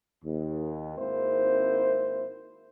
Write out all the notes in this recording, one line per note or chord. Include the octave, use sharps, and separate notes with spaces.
D#2
G#1 G#2 A#3 C4 E4 C5